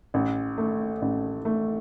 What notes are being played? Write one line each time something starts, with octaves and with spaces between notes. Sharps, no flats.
A1
A3
A1
A3